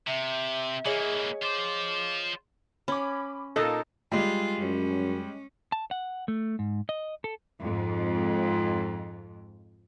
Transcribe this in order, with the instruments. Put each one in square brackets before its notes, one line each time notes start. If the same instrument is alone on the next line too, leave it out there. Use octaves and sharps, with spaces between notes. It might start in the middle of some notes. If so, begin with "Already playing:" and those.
[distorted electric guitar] C3 [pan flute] E5
[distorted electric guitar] E3 A#3 [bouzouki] G#4 C#5 D#5
[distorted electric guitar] F4 C5 [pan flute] D6
[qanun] C#4 [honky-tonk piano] B5 D6
[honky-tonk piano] A#2 A#3 F4 [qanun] D#4 A5 [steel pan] A4 D#5
[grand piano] G3 G#3 [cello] F4
[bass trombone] F#2 [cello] C#4
[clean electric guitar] A5
F#5
A3
G#2
D#5
A4
[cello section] F2 G#2